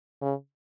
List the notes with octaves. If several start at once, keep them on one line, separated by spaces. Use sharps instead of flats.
C#3